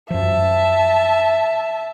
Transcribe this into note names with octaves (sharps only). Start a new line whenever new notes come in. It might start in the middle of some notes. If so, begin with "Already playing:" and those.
F#2 F3 E5 A5